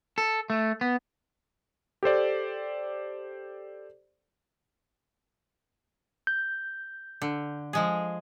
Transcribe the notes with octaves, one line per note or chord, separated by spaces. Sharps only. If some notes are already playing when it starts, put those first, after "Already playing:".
A4
A3
B3
G4 A4 C5 D5
G6
D3
F3 G#3 G#4